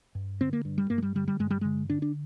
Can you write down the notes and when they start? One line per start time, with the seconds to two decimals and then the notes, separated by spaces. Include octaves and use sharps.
0.15 G2
0.41 D3 C4
0.53 A#3
0.65 G2
0.78 G3
0.90 G2 A#3
0.98 G#3
1.02 G3
1.15 D3 G3
1.28 G3
1.39 G2 G#3
1.50 G3
1.61 D3 G#3
1.90 D3 D4
2.02 D4